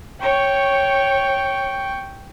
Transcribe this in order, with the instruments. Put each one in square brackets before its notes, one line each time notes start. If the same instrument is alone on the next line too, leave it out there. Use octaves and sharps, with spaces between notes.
[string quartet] C#5 [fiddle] G5 C#6